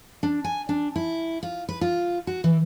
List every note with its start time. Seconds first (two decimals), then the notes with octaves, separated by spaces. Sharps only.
0.23 D4
0.44 G#5
0.69 D4
0.96 E4
1.43 F4
1.69 B4
1.81 F4
2.27 F#4
2.44 E3